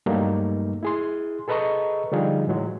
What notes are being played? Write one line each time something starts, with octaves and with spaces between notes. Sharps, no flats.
G2 F#3 G3 A3 A#3 D#4
E4 G#4 C6
G#4 A4 B4 D#5 A#5 C#6
D3 F3 G3 D#4 F4 G#4
A2 E3 F#3 G#3